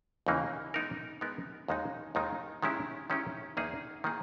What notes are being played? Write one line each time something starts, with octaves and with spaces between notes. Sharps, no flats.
D#2 C#3 E3 A#3 D#4
G#3 B3 D#4 A#4
G#3 B3 D#4 A#4
D#2 D#3 G#3 D#4
D#2 D#3 G#3 D#4
D#3 G#3 C#4 E4 G4
D#3 G#3 C#4 E4 G4
E2 D#3 A#3 D#4 G#4
D#3 A#3 D#4 G#4